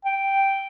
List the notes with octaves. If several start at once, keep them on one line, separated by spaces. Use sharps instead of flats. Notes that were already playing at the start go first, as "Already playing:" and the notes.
G5